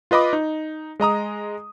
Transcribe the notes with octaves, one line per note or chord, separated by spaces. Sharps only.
F4 B4 D#5 B5 D6
D#4
G#3 D#5 A#5 D#6